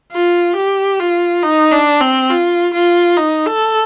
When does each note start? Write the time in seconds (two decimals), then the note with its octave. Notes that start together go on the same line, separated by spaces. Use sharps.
0.12 F4
0.56 G4
0.99 F4
1.43 D#4
1.71 D4
2.01 C4
2.30 F4
2.74 F4
3.17 D#4
3.46 A4